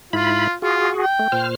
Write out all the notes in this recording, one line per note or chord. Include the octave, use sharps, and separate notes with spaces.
G#2 E4 F4 B5
F4 F#4 G#4
G5
A3
A#2 C5 F6